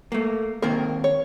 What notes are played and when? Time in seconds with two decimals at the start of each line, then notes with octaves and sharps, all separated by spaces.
0.12 A3 A#3
0.62 D#3 A#3 C4 A#4
1.04 C#5